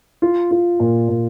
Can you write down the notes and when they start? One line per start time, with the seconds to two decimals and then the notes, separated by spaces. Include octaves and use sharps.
0.22 F4
0.51 F4
0.80 A#2
1.09 A#2